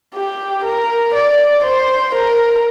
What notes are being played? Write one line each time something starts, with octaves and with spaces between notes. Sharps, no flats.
G4
A#4
D5
C5
A#4